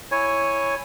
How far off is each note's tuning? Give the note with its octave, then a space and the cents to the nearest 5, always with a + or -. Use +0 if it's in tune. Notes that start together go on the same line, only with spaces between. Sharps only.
E4 +0 C#5 +0 G#5 +0